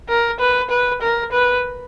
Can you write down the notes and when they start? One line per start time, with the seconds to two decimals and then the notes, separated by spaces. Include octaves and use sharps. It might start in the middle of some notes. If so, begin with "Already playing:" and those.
0.09 A#4
0.40 B4
0.71 B4
1.02 A#4
1.32 B4